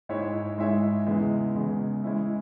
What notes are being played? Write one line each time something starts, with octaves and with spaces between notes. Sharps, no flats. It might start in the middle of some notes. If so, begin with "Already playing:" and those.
G#2 G#3 E4 C#5 E5
G#2 G#3 E4 C#5 E5
E2 C#3 E3 G#3
E2 C#3 E3 G#3
G#3 C#4 E4